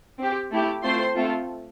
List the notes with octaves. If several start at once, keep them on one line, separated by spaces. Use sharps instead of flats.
C4 G4
A3 E4 G4
A3 C4 F4 A4 C5 C6
A3 C4 F4 A4